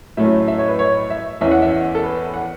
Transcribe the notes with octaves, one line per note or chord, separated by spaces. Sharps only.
A2 F#3 A3 C#4 E5
E5
C#5
B4
C#5
E5
E2 E3 C#4 E5
F#5
E5
A4
B4
F#5